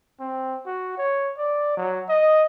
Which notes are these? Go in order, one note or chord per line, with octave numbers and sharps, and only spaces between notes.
C4
F#4
C#5
D5
F#3
D#5